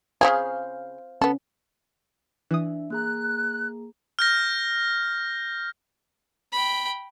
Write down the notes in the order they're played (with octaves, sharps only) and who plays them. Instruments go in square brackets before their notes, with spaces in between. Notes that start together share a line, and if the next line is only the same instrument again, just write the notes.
[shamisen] C#3 G3 G#4 [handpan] C5 F5
[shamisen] B3 A4 [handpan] C#4
[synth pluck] E3 D#6 [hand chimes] D4 E5
[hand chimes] A#3 G#4 A#5 [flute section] F#6
[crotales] F6 G6 A#6
[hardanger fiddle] G5 B5